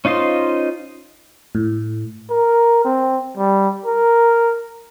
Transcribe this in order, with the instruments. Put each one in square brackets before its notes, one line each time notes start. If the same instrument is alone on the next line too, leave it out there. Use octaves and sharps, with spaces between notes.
[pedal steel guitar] C#4 D#4 F4 C5 D#5
[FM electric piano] A2
[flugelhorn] A#4
C4
G3
A#4